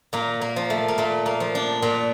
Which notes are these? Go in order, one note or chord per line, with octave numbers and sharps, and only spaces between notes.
A#2 A#3
A#3
F3
A3
A#3
A#2 A3
A#3
F3
D4
A#2